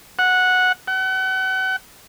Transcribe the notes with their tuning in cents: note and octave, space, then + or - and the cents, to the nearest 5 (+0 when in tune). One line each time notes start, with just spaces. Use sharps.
F#5 -10
F#5 +35